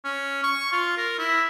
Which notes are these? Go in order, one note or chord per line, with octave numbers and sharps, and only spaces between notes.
C#4
C#6
F4
A#4
E4